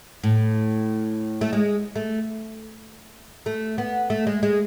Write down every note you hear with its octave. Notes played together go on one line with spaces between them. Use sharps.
A2
A3
G#3
A3
A3
B3
A3
G#3
G#3